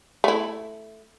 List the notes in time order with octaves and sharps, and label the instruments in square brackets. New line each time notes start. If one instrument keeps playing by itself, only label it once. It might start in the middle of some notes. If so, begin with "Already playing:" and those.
[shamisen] A3 E4